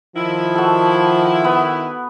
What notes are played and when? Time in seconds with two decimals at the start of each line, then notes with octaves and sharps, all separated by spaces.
0.16 D#3 F3 E4
0.55 F#4 A4
1.44 B3